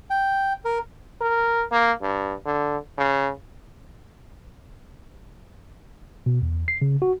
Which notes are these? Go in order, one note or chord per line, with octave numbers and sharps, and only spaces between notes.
G5
A#4
A#4
A#3
G2
D3
C#3
B2
E2
C7
C#3
F#4